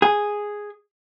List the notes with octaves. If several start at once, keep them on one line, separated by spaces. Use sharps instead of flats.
G#4